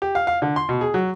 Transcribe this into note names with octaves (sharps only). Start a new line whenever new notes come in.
G4
F5
F5
D3
C6
B2
G#4
F#3